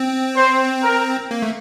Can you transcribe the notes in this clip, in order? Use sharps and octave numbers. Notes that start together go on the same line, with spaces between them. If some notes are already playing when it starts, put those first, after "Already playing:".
Already playing: C4
C5
A#4
A#3
A3